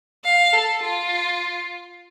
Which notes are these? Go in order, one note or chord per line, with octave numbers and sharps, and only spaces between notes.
F5
A4
F4